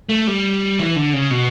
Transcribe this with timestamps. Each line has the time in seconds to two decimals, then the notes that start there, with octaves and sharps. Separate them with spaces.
0.09 A3
0.27 G3
0.79 E3
0.96 D3
1.13 C#3
1.31 B2